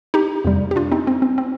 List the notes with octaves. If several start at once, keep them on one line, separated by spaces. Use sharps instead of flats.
D#4 G4
F2 C3 G3
G4
D4 F4
C4 D#4
C4
C4
C4